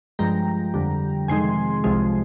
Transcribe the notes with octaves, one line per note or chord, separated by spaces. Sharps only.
G2 F3 G#3 G5 A#5
F2 D3 G3
F2 C3 D#3 G#3 G#5 C6
C2 C3 F3 G#3